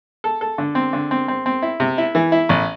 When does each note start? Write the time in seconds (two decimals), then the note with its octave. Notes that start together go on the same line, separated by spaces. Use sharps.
0.24 A4
0.41 A4
0.58 D3
0.75 C4
0.93 D3
1.11 C4
1.28 C4
1.46 C4
1.62 E4
1.80 C3
1.98 E4
2.15 E3
2.32 E4
2.49 A1